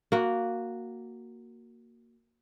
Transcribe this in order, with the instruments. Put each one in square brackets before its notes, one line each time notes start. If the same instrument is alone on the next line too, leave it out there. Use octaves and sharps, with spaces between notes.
[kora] A#3 F#4